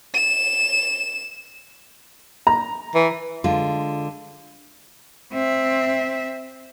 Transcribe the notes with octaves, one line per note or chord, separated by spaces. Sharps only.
E7
A#5
E3
D3 G#3 F4
C4 E5